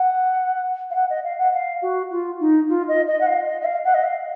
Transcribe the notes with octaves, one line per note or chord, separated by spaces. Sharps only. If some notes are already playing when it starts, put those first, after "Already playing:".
Already playing: F#5
F5
F#5
D#5
F5
F#5
F5
F#4
F4
D#4
F4
D#5
D#5
F#5
F5
D#5
D#5
F5
F#5
D#5
F5